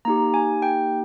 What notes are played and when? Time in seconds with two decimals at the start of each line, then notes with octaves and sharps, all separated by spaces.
0.05 A#3 D#4 G4 A#5
0.34 G#5
0.62 G5